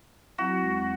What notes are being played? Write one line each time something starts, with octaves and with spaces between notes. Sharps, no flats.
F#3 C4 E4 F#4
E2 G#3